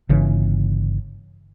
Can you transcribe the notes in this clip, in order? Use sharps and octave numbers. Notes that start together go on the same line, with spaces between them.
G1 C#3 E3